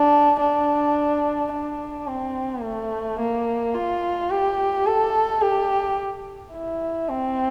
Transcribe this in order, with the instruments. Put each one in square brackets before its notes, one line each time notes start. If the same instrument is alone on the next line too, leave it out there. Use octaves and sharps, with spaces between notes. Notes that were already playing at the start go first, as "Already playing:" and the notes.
Already playing: [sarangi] D4
D4
D4
C4
A3
A#3
F4
G4
A4
G4
E4
C4